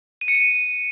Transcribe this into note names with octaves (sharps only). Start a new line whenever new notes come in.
D#7
C#7
D#7